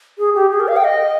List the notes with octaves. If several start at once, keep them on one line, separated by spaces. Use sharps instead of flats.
G#4
G4
G#4
A#4
F5
G5
D#5